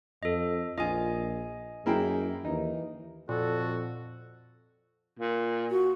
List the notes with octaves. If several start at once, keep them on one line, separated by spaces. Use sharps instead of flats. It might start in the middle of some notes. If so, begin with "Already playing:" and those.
F2 A4 D#5
A#1 F4 D#5 G#5 D#6
F#2 A#3 E4 G#4 G5
D#2 E3 D#4
F2 A#2 F#4 A4
A#2
F#4